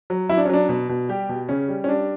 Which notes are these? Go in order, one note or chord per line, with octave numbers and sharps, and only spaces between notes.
F#3
F#3 E4
D4
C#4
F#3 D4
B2
B2
G3 G4
B2
C#3 C#4
G3
C#4
G3 D4